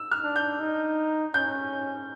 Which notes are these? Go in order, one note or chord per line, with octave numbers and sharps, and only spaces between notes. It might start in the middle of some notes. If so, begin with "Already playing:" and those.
Already playing: E6
F6
D4
G6
D#4
C#4 G6